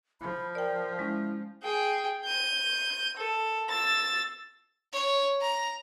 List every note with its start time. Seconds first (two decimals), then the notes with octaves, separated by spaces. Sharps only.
0.21 F3 B5
0.55 A#4 D5 G5
0.99 G#3 C#4 E4
1.63 G#4 G5
2.25 G6 D#7
3.17 A4
3.69 E6 A6
4.93 C#5
5.41 A#5